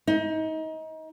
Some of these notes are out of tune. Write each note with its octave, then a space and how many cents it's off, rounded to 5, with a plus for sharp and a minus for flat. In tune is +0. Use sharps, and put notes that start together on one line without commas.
D#4 +25